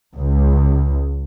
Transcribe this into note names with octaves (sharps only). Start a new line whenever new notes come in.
C#2